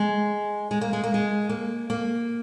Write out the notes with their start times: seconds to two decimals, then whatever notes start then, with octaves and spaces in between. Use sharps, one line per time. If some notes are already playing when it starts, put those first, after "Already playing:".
Already playing: G#3
0.71 G#3
0.81 A#3
0.93 G#3
1.04 A#3
1.14 G#3
1.49 A#3
1.90 A#3